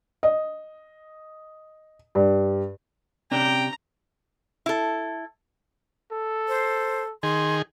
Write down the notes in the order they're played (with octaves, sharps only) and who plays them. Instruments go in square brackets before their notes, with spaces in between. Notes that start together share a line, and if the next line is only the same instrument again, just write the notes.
[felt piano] D#5
G2
[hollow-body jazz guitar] C3 C#4 D4 [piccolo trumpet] G5 [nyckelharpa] A#5
[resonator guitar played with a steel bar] E4 A4
[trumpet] A4
[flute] C5
[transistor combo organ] D#3 G#4 [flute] C6